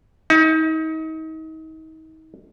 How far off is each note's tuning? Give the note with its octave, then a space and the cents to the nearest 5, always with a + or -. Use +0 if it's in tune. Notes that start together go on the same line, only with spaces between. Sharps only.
D#4 +35